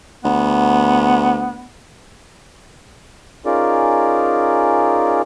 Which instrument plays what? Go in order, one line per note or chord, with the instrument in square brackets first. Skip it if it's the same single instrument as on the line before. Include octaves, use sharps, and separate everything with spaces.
[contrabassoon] D2 [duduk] B3
[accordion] C#4 D#4 F4 G#4 A#4 D5